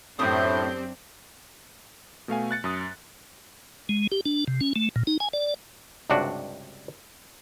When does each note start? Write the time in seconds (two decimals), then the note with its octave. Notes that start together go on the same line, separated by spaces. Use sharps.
0.19 F#2 A2 C4 D4 G4 C5 D#6
2.28 B2 A3 F5 G#5
2.51 F#6 A6 C#7
2.64 F#2 D#6
3.89 G#3
4.12 G4
4.26 D4
4.48 C3
4.61 C#4
4.76 A3
4.96 A#2
5.07 D#4
5.20 G#5
5.33 D5
6.10 C#2 G2 C3 D4 F#4